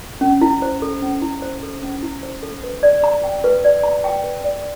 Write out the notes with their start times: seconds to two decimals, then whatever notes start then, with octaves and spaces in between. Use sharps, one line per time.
0.21 C#4
0.41 E4
0.62 C5
0.82 A4
1.02 C#4
1.22 E4
1.42 C5
1.63 A4
1.83 C#4
2.03 E4
2.23 C5
2.43 A4
2.64 B4
2.83 D5
3.04 A#5
3.24 G5
3.44 B4
3.64 D5
3.83 A#5
4.04 G5
4.24 B4
4.44 D5